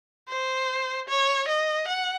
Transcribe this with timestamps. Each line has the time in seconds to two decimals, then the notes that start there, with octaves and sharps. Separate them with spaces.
0.28 C5
1.08 C#5
1.48 D#5
1.88 F#5